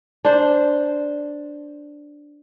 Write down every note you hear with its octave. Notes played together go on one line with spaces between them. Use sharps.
D4 C5